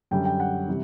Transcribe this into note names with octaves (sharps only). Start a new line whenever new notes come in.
F#2 D3 G3 G5
G5
F#5
C3 E3 G3